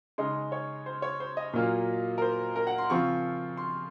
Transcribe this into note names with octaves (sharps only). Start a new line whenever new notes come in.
C#3 G#3 D#4 C6
C#5
C5
C#5
C5
D#5
A#2 F#3 A#3 F4
A#4
C5
A#4
F#5
C6
C#3 F3 C4 F4 C#6
C6